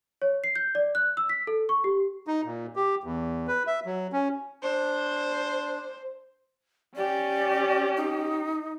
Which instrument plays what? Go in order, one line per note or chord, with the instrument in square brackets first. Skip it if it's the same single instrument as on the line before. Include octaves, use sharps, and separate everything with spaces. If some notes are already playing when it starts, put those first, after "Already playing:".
[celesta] C#5
C7
G6
D5
F#6
E6
B6
A4
C#6
G4
[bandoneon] D#4
A#2
G4
E2
B4
E5
F#3
C#4
[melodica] D4 [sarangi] C5
[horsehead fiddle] C#4 G4 [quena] D5
[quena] D#4